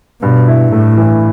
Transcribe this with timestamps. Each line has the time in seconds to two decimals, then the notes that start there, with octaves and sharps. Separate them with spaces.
0.22 G2 B2
0.48 E4
0.72 A2 A3
0.98 E3